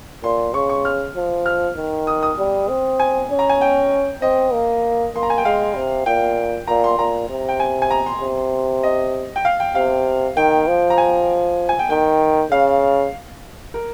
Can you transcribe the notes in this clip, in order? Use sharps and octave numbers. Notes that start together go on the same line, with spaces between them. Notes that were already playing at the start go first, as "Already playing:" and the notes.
A#2 C6
C#3 C#6
C#6
F6
F3
F6
D#3
D#6
D#6
G3
C4
G#5
C#4
A#5
G#5
G5
C4 D#5
A#3
A#3 C6
A#5
G#5
G5
G#3 F5
C3
A#2 G5
A#2 A#5
C6
A#2 A#5
C3
G5
G#5
G#5
A#5
C6
C3
D#5
G5
F5
G5
C3 F5
D#3 G5
F3
A#5
G#5
G#5
G5
D#3 G5
C#3 F5
A#4